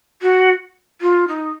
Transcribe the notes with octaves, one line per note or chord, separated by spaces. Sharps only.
F#4
F4
D#4